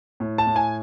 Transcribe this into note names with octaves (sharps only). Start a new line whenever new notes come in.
A2
A5
A2
G#5